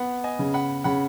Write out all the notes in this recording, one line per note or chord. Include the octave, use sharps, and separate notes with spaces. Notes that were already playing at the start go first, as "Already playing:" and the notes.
Already playing: B3 F#5 B5
D#5 G#5
C#3
F#5 B5
C#3 F#5 B5